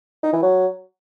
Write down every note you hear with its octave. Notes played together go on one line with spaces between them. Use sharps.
D#4
E3
F#3